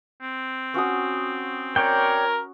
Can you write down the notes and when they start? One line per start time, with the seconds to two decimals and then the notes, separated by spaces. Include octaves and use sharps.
0.22 C4
0.74 C#4 F#4 D#6
1.76 A#4 C#5 D5 G5